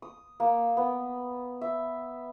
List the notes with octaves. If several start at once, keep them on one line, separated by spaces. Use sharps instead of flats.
D#6
A#3
B3
E5